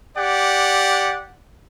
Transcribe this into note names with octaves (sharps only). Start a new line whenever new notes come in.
G4 D5 F#5